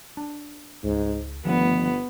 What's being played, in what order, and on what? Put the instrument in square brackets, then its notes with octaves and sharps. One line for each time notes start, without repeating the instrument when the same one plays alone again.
[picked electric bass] D4
[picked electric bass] C#2 [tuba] G#2
[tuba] G1 [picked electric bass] D#3 F3 A3 [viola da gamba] B3